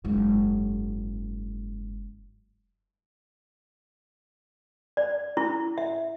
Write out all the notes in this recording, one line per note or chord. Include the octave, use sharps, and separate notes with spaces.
F#1 G#2
D5
E4
E5